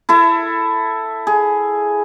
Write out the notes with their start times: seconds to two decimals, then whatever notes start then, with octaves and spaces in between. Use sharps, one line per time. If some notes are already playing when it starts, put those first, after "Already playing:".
0.09 E4 A4 E5
1.27 G#4